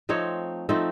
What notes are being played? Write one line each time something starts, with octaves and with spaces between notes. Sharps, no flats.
F3 A3 C4 D#4 C#5
F3 A3 C4 D#4